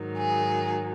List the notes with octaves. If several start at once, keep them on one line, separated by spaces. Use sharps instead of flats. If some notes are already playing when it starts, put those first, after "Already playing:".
Already playing: G#2 D#3 F#3
G#4